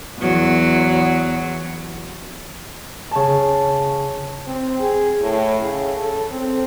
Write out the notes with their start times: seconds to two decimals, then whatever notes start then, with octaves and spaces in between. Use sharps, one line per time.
0.19 E2 F#3
3.11 C#3 A5
4.47 C4
4.80 G#4
5.21 A2
5.61 C#3
5.97 A4
6.31 C4